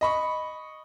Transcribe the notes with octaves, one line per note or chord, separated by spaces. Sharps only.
D#5 B5 C#6